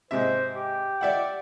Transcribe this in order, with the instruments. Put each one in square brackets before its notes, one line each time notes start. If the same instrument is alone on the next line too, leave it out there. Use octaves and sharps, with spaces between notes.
[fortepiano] G#2 C3 E5 [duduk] C5
[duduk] G4
[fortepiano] D5 E5 F#5